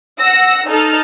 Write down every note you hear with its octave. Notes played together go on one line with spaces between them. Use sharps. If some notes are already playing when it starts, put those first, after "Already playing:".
F#5 E6 A#6
D#4 A4 F6